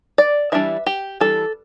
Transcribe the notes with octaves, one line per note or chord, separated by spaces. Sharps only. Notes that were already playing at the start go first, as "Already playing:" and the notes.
D5
E3 G3 D4 E5
G4
E3 G3 D4 A4